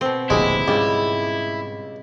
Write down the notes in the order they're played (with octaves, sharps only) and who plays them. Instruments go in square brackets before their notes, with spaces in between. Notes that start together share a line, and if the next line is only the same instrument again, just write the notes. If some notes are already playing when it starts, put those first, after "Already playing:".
[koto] B2 C4
[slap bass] D1 A#1 C#3 [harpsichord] G#3 [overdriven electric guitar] E4 [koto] G4 E5 F#5
[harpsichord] C#2 [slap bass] G#2 [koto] G3